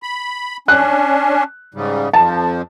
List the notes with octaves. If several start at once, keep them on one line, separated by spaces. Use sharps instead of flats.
B5
C#4 D4 F#6
G#2 C#3 G3
F2 F3 A5